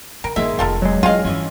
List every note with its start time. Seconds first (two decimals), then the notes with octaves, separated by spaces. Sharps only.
0.24 C#3 A#4
0.36 G1 D#3 G#3 A#3 C#4 E5
0.59 F1 F4 A4 A#4
0.82 E2 C3 F#3 G#3
1.03 E3 C#4 F4 G#4 D#5 F5
1.25 G2 E3 C#4